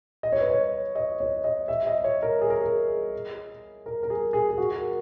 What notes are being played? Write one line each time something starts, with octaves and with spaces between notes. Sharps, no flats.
D#5
C#5
B4
C#5
D#5
C#5
D#5
E5
D#5
C#5
A#4
G#4
A#4
G#4
A#4
A#4
G#4
G#4
G#4
F#4
A#4